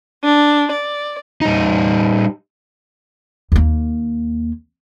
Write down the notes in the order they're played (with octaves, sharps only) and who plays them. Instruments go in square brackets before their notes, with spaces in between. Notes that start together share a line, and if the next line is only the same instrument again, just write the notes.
[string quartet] D4
D5
[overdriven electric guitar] G3 D#4
[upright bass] D#2 A#3